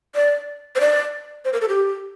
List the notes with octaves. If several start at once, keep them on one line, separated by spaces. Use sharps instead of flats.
D5
C5
D5
C5
A#4
A4
G4